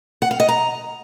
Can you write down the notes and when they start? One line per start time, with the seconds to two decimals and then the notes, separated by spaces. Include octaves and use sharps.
0.22 F#5
0.31 F5
0.40 D#5
0.49 A#5